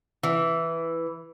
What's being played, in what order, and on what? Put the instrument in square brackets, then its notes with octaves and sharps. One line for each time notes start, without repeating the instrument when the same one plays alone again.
[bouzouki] E3